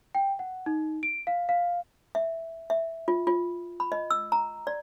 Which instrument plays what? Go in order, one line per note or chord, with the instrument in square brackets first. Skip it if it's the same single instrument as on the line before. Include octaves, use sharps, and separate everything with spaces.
[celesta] G5
F#5
D#4
D7
F5
F5
[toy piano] E5
E5
F4
F4
B5
D#5
E6
A#5
D5